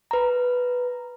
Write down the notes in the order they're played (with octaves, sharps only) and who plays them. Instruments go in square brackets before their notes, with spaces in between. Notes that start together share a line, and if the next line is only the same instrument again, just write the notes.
[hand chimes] B4 A#5